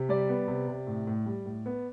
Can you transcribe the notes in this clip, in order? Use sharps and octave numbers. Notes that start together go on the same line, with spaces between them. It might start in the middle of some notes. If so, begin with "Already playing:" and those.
Already playing: C3
G3 D5
B3
C3
C3
A2
A2
G3
A2
B3